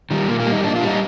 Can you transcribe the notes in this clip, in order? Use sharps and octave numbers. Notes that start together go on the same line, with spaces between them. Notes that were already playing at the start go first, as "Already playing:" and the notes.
D#3 G3
A#2 A#3
A#3
G3
D#4
A#2 D4
F4
G3
D#4